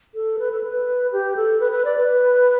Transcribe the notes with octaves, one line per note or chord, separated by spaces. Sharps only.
A4
B4
A4
B4
G4
A4
B4
B4
D5
B4